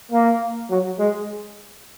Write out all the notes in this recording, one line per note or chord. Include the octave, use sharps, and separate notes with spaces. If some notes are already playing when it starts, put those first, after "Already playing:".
A#3
F#3
G#3